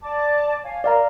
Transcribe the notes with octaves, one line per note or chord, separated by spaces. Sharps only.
D5 A5 D6
C#5 F5 G#5
A#4 D5 F5 A#5